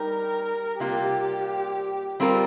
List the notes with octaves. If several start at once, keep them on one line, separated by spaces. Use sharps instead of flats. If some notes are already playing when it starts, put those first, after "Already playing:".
Already playing: G3 D#4 G4 A#4
C3 G3 A#3 F4 G4
G3 C4 F4 A#4